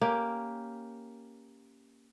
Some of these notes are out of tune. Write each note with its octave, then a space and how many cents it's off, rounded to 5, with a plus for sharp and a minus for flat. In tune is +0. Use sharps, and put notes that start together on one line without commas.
A#3 +0 C#4 +0 G4 +0